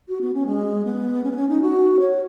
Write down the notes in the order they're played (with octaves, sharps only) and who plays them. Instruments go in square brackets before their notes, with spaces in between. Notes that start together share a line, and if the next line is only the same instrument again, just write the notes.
[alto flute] F#4
B3
C#4
G#3
B3
C#4
B3
C#4
D#4
F#4
C#5